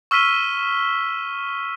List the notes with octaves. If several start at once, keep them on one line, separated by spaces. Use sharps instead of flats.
C#6 E6 F6 B6 D#7 G7